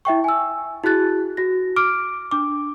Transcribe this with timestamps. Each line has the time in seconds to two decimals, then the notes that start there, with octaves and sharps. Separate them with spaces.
0.05 E4 E5 G5 C#6
0.24 G#5 E6
0.84 E4 F#4 G#4 F#6 A6
1.37 F#4 A#6
1.76 D6 F6 D7
2.31 D4 D6